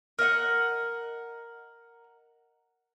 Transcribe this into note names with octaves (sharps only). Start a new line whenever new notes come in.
A#4 D#5 E5 F#5